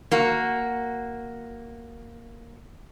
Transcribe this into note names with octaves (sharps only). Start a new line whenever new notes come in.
A#3 F#4